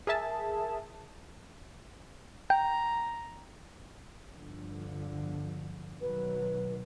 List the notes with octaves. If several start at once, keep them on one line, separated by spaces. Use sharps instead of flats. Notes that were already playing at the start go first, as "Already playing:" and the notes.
G#4 A#4 E5 A5
G5 A#5
G1 D3 F3
B2 D#3 F#3 B4